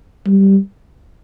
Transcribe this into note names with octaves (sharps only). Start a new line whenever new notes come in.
G3